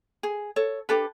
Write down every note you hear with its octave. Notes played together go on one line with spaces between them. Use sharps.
G#4
A4 C#5
D4 G4 A4 B4